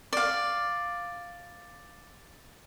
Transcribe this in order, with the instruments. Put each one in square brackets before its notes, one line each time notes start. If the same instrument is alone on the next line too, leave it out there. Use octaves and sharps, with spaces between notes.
[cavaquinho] D5 F5